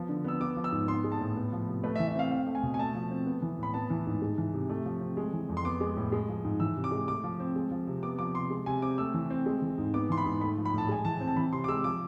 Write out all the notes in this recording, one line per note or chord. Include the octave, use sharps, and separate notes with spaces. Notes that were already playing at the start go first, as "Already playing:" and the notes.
Already playing: F3 B3
D3
B3 E6
B3 D6
F3
E6
G#2
B3 C6
G#3
A5
A2
B3
F3
C3
A3 B4
E5
E3
E5
C4 F5
C4 F5
A3
G#5
B2
G#5
A3 A5
F3
C4
B3
E3
A2 B5
B3 A5
E3
G#2
G#3
E3
C3
A3
F3
C4
G#3
E3
F2
C6
B3 D6
G#3
A2
G#3
F3
G#2
E3 E6
C3
D6
G#3
A3 D6
F3
C4
G#3
F3
C3
B3 D6
F3 D6
C3 C6
G#3
C3 G#5
C4 D6
A3 E6
E3
C4
G#3
E3
G#2
B3 D6
E3 C6
B5
G#2
A3 B5
F3
B5
A2 A5
G#3 G#5
E3 A5
C4
A5
E3 B5
C3 C6
D6
G#3 E6
F3 D6